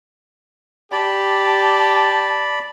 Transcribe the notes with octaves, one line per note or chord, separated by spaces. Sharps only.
G4 D5 A5 B5